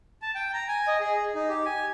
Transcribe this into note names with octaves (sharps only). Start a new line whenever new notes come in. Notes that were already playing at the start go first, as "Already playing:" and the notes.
A5
G5
A#5
G#5
D#5
G#4
D#4
G4
G#5